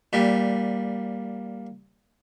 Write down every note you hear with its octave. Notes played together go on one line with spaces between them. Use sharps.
A#2 G3